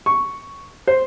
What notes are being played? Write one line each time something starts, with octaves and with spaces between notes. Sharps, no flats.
C#6
C5